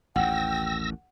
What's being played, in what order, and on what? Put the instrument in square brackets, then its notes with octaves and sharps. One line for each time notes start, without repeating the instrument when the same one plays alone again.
[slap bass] A1 D#2 [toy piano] F#5 [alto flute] G5 [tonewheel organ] E6 A#6